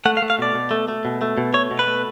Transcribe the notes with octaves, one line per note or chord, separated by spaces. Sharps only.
A3 F#5
F5
A3
F5
B2 D5
B2
A3
A3
B2
A3
B2
A3 C#5
B2
B4
A3